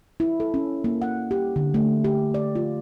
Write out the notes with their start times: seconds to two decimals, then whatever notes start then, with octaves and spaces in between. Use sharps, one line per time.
0.20 E4
0.40 A4
0.54 C#4
0.84 A#3
1.02 F#5
1.31 G4
1.56 D3
1.74 A3
2.04 G4
2.34 D5
2.55 F4